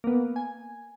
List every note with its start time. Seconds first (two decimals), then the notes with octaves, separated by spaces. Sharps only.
0.04 A#3 B3
0.36 G#5